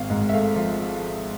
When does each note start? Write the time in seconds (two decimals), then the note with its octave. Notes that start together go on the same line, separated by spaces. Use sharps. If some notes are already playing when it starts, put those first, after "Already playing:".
Already playing: G#1 F5
0.10 G#2
0.29 E5
0.33 A3 F5
0.56 F3